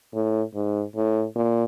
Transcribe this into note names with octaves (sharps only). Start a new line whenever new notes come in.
A2
G#2
A2
A#2